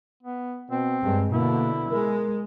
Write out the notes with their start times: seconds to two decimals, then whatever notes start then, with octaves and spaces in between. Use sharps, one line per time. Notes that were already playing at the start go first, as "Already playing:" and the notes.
0.23 B3
0.70 B2 C4
1.04 G2 G#3
1.33 B2 D3 A#3 E4
1.91 G#3 A#4